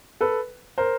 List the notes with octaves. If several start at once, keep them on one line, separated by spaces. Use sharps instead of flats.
A4 B4
A#4 C5